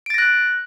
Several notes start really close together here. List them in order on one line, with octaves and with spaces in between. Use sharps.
D7 A6 A#6 F#6